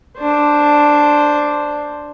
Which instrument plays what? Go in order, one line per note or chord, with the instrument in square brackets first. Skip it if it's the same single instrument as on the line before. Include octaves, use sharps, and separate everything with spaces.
[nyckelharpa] D4 C5